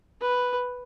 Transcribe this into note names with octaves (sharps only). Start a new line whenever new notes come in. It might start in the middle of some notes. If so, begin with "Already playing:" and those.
B4